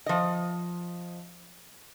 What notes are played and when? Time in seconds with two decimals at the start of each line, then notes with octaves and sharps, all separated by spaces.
0.06 F3 D#5